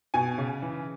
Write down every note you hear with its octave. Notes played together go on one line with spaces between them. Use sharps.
B2 G#5
C#3
E3